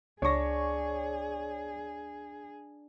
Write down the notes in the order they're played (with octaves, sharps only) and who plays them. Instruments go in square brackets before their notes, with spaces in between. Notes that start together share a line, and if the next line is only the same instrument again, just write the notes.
[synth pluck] C#2 A#6 [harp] D4 [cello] G#4 [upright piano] C#5 C#6